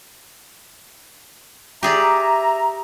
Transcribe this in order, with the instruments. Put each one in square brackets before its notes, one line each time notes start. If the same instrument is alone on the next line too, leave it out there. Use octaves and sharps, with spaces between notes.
[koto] G4 G#4 D5 [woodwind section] E5 A#5